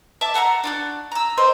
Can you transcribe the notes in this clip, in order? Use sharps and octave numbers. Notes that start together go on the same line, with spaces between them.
E5 A5 D6
A4 F#5 A5 A#5
D4 F4 F#4
A#5 E6
A#4 C5 D#5